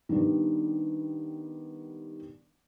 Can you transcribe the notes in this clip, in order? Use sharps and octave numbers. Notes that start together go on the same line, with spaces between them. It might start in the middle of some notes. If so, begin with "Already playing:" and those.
D#3 G3 B3 D4